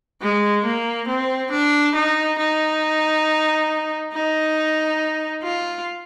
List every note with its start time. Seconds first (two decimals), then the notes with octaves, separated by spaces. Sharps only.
0.22 G#3
0.65 A#3
1.08 C4
1.51 D4
1.96 D#4
2.39 D#4
4.13 D#4
5.43 F4